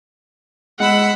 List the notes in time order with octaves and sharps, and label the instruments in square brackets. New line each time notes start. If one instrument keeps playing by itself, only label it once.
[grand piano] G#3 [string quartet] F#5 B5 E6